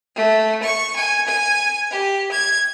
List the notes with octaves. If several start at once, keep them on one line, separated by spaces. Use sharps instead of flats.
A3
C#6
G#5
G#5
G4
G#6